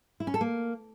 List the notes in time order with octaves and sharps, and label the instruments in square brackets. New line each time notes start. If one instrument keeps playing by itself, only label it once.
[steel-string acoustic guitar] E4
C#4
A4
A#3